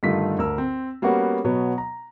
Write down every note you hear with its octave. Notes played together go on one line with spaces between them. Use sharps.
G2 D3 D#3 A3 F4 B6
D2 A#4 E6
C4
G3 A#3 B3 C#4 F#4
B2 F#3 B3
A#5